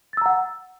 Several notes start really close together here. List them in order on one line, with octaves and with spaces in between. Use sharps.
A6 E6 A#5 F#5